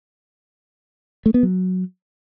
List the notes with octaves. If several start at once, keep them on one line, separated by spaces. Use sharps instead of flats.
A3
B3
F#3